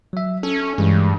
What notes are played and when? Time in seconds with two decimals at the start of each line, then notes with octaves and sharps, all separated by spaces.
0.13 F#3 E5
0.43 C#4 A4
0.78 G2 E3 G#3